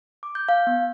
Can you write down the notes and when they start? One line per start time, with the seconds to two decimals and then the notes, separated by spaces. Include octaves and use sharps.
0.23 D6
0.35 G6
0.49 F5
0.67 B3